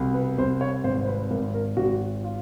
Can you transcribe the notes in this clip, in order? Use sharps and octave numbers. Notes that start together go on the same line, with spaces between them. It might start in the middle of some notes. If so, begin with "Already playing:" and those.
Already playing: C2 B2
B4
C2 C5
C#5
G#1 C5
C5
B4
G#1 A#4
A#4
G#1 F#4
F4